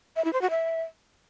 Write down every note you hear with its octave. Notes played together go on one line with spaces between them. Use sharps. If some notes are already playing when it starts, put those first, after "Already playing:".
E5
E4
C5
F#4
E5